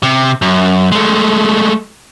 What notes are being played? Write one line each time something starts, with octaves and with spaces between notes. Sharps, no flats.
C3
F#2
G#3 A3